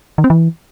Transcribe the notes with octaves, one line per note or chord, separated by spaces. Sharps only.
D#3
C4
E3